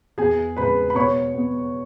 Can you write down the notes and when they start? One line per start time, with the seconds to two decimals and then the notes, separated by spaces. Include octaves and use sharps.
0.18 E2 G#4 G#5
0.57 C#3 G#3 B4 B5
0.90 B5
0.95 B2 C#5 C#6
1.34 B3